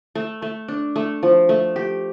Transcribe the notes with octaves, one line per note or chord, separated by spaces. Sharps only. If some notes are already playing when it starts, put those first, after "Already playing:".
A3
A3
D4
A3
F3
A3
G4